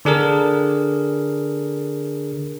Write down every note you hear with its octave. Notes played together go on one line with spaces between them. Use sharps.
D3 D4 G#4 A#4